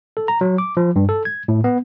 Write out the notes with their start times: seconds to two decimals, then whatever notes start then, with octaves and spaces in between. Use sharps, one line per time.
0.17 A4
0.28 A#5
0.41 F#3
0.58 D6
0.77 F3
0.96 G2
1.09 A4
1.25 G#6
1.48 A2
1.64 B3